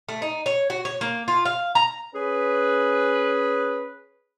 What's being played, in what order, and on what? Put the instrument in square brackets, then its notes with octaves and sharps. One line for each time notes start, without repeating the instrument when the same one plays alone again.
[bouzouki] A3
D#4
C#5
F#4
C#5
A#3
F4
F5
A#5
[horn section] C#4 G#4 B4